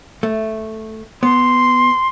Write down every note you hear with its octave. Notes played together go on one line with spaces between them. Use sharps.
A3
B3 C6